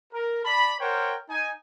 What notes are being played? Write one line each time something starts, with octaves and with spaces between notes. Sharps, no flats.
A#4
D5 A5 B5
A#4 C5 C#5 F#5 G5
D#4 G#5